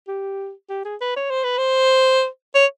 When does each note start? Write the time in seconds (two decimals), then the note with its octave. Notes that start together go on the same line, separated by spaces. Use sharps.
0.08 G4
0.69 G4
0.85 G#4
1.01 B4
1.16 C#5
1.30 C5
1.43 B4
1.58 C5
2.54 C#5